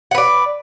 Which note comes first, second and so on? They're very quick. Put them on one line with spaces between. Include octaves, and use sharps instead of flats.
F#5 B4 D5